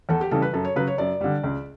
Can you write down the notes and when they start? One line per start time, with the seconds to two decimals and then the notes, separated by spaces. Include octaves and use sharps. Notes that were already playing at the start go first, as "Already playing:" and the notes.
0.09 E2 A4
0.21 G4
0.31 C#3 E3 G3 A4
0.42 B4
0.53 F#2 A4
0.65 C#5
0.76 C#3 F#3 B4
0.87 C#5
0.98 F#2 D5
1.21 D3 G3
1.44 C#2